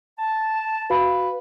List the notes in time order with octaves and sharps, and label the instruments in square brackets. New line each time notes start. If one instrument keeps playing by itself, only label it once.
[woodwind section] A5
[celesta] F#4 F5 B5 [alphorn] B4